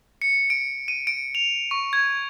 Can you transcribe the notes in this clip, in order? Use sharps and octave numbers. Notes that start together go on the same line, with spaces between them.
C#7
D7
D#7
D7
F7
C#6
G#6